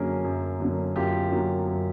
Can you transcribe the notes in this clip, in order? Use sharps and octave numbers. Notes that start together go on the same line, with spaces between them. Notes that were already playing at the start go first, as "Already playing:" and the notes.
Already playing: F#2 D3 F#3 A#3 C#4 G#4 A#4
F#2
D3 F#3 A#3 C#4
F#2 F4 G4
D3 F#3 A#3 C#4
F#2